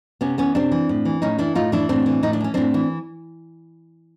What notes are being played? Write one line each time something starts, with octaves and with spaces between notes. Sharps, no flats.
C3 B3 C#4
E3 B3 C#4
C3 C4 D4
E3
A2
E3
A2 C#4 D#4
E3 D4 E4
A2 D#4 F4
E3 D4 E4
A2 C4 D4
E3
A2 D#4
D4
E3 C#4
A2 C4 D4
E3